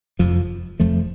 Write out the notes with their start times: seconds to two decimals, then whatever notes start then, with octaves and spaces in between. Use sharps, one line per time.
0.19 F1 F2 F3
0.80 F1 F2 F3 A3